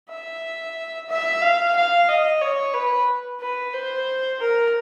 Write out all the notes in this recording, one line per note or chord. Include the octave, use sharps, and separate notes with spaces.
E5
E5
F5
F5
D#5
C#5
B4
B4
C5
A#4